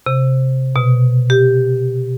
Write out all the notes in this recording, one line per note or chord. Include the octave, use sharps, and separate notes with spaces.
C3
B2
G4